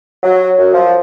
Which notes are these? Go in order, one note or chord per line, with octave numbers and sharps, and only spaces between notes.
F#3
F#2
F3